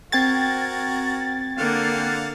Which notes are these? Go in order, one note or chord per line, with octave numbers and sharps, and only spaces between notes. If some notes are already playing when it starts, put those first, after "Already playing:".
C4 F#4 A#4 G5 G#6 A6
D3 A#3 F5 F#5